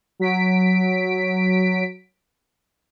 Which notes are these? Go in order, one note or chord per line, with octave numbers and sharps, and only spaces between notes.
F#3 B6 D7